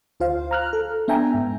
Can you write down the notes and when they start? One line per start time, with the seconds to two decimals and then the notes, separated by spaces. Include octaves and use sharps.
0.20 D2 F4 C5 F5
0.51 A#5 F6 F#6
0.73 A4
1.08 B3 D4 E5 G5 G#5 A#5
1.34 G#2